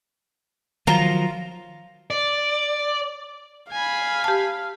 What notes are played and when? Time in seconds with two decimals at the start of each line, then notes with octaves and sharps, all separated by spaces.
0.87 D#3 F3 F#3 F4 A#5
2.10 D5
3.72 F5 G#5 B5
4.24 G4 A5